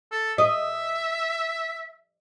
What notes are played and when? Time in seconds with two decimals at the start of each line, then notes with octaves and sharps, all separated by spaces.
0.12 A4
0.38 D#5 E5